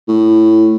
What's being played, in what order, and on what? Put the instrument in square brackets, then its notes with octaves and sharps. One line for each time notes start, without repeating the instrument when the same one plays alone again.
[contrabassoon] A2